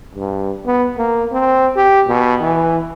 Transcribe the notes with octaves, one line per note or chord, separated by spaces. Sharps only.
G2
B3
A#3
C4
G4
B2
E3